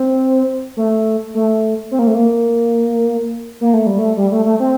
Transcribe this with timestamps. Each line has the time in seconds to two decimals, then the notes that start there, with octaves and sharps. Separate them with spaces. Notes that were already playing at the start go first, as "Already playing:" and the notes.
Already playing: C4
0.77 A3
1.35 A3
1.91 C4
1.99 A#3
2.07 A3
2.14 A#3
3.61 A#3
3.74 A3
3.87 G3
3.99 A3
4.17 G3
4.32 A3
4.45 A3
4.60 C4